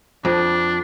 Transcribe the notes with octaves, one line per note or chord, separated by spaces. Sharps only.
F2 D4